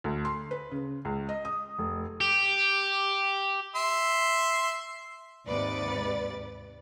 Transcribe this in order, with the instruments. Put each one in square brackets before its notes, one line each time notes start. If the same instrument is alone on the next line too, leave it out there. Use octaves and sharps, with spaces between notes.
[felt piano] D2
C6
B4
C#3
C#2
D#5
D#6
F1
[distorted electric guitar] G4
[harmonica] E5 C6
[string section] D#2 G#2 C3 B4 D5 A6